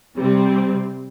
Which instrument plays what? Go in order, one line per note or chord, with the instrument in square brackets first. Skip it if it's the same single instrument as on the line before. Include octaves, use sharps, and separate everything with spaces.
[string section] C3 G3 C4